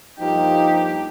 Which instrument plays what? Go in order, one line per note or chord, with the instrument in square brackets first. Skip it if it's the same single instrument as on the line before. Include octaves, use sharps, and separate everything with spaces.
[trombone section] G2 F3 A#3 D#4 [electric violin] G4